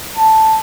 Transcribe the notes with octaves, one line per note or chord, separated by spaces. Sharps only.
A5